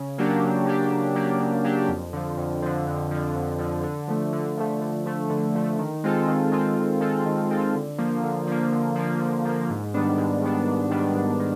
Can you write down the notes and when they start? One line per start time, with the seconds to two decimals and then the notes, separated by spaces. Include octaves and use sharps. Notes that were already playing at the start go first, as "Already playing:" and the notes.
Already playing: C#3
0.18 F#3 A#3 D4 G4
0.43 C#3
0.66 F#3 A#3 D4 G4
0.91 C#3
1.15 F#3 A#3 D4 G4
1.40 C#3
1.64 F#3 A#3 D4 G4
1.88 F2
2.13 D3 F3
2.37 F2
2.62 D3 F3
2.87 F2
3.11 D3 F3
3.35 F2
3.59 D3 F3
3.84 D3
4.08 F3 A3
4.33 D3
4.57 F3 A3
4.81 D3
5.06 F3 A3
5.30 D3
5.55 F3 A3
5.78 D#3
6.04 G#3 C4 F4 A4
6.28 D#3
6.52 G#3 C4 F4 A4
6.77 D#3
7.01 G#3 C4 F4 A4
7.25 D#3
7.50 G#3 C4 F4 A4
7.74 D3
7.98 F3 A#3
8.23 D3
8.47 F3 A#3
8.72 D3
8.96 F3 A#3
9.20 D3
9.45 F3 A#3
9.70 G#2
9.94 D#3 G3 B3 D4
10.18 G#2
10.42 D#3 G3 B3 D4
10.67 G#2
10.90 D#3 G3 B3 D4
11.15 G#2
11.40 D#3